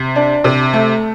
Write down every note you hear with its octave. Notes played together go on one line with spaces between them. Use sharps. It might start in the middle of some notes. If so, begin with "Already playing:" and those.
Already playing: C3
D4
C3
A3